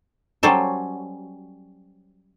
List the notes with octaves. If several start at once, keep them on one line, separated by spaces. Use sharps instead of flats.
F#3 G3 C#4 A4 C5